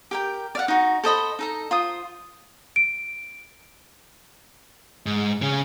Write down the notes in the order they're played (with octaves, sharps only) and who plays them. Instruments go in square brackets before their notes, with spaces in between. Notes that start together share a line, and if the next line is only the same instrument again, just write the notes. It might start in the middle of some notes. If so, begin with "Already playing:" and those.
[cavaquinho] G4 A#4 G5
D5 F5 F#5
D#4 F#4
A4 C5 D#5 B5
D#4 A4 A#5
F4 C5 D#6
[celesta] D7
[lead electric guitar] G#2
C#3 G#4